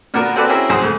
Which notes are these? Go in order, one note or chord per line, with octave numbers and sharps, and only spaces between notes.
A#2 D3 B3 F#4 A#4
A#3 C4 F#4 A4 B4 D5
C4 C#4 E4 F#4 G#4 A#4
B1 F2 F#4 G#4 C5 D#6
G#2 C#3 A3